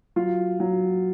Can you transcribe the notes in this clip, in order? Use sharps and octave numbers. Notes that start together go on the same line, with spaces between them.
F#3 F4
F#3